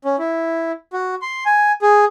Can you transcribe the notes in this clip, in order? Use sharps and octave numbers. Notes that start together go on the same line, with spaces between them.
C#4
E4
F#4
C6
G#5
G#4